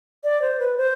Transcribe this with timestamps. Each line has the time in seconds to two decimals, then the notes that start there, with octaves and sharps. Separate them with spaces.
0.24 D5
0.42 C5
0.59 B4
0.78 C5